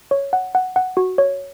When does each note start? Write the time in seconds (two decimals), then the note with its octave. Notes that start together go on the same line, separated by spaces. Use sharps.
0.11 C#5
0.33 F#5
0.55 F#5
0.76 F#5
0.97 F#4
1.18 C#5